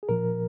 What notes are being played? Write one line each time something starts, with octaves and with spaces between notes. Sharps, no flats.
G#4
A#2 F3 A#4